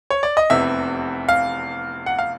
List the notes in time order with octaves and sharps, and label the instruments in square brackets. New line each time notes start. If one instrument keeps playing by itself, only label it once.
[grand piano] C#5
D5
D#5
F1 E2 C3 E3 E5
F5
F#5
F5